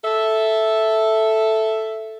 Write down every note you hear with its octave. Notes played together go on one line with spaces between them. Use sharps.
A4 E5